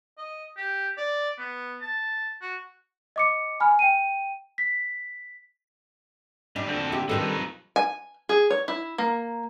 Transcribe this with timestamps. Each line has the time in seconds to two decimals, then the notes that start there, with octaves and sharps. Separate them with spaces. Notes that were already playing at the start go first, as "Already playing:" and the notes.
0.18 D#5
0.57 G4
0.98 D5
1.38 B3
1.81 A5
2.42 F#4
3.16 D#5 D6 C#7
3.60 G#5 B5 F6
3.79 G5 D#7
4.58 B6
6.56 A#2 G3 D4
6.69 D2 A#2 C4 A4
6.92 E4 G4
7.09 D#3 F3 G3 C4 D#4 A4 B4
7.76 G#5
8.29 G#4
8.50 C#5
8.68 E4
8.98 A#3